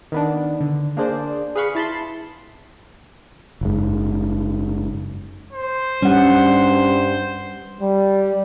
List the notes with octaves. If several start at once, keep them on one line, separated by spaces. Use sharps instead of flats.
D#3 B3 D4
D3
A#3 D4 G#4 C5 D5
G#4 B4 F5 B5 C#6
E4 A5 B5 C6
F#1 G#2
C5
G2 G3 C#4 F#5
G3